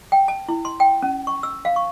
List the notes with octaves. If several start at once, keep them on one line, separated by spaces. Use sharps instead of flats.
G5
A5
E4
C6
G5
C#4
C#6
E6
F5
C#6